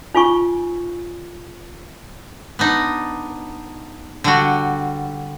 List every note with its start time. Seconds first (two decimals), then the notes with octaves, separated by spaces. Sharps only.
0.14 D#4 F4 G#5 C#6
2.59 B3 D4 D#4
4.24 D3 G3 F#4